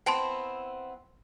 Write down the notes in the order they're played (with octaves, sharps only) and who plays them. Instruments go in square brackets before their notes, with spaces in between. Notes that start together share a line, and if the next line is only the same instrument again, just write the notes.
[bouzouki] B3 C4 E4 [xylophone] G5 A5 C6